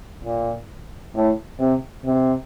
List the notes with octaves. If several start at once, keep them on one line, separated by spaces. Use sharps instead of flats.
A#2
A2
C3
C3